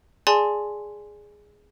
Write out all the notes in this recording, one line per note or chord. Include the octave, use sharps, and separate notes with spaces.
G#4 D5 G#5 A5 C6